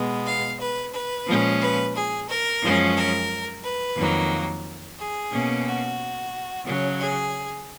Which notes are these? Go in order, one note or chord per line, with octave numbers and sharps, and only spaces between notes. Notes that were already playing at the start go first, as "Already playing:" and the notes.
Already playing: B2 G#3 B3
F5
B4
B4
A#2 F3 G#3 C#4
B4
G#4
A#4
F#2 F3 G#3 C#4
A#4
B4
F2 D#3 F#3 A#3
G#4
B2 A#3 C#4
F#4
C#3 F#3 C#4
G#4